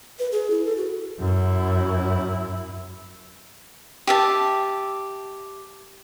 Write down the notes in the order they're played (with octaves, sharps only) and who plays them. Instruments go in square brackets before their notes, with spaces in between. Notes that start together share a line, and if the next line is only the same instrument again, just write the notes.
[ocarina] B4
G#4
E4
A4
F#4
[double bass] F#2 E4
[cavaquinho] G4 E5 A5